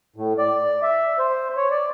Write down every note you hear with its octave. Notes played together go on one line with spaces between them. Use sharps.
A2
D5
E5
C5
C#5
D5